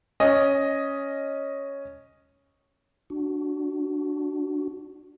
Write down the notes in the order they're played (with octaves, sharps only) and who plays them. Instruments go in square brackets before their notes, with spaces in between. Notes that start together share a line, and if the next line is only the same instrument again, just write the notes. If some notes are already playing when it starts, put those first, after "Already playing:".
[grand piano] C#4 D#5
[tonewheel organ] D4 F#4